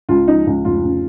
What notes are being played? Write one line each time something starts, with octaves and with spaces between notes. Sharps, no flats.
C#2 F4
F3 D#4
C#2
F1 F4
C#3